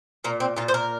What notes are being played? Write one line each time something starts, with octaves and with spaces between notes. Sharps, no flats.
A#2 A#3
C4
A#2 F4
C5
A#4